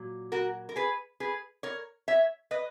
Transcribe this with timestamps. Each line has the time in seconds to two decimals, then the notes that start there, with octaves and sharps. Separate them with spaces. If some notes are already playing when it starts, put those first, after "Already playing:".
Already playing: A#2 F#3
0.32 F#4 A#4
0.69 A#4
0.76 G#4 B4
1.20 G#4 B4
1.63 A#4 C#5
2.08 C#5 E5
2.51 B4 D#5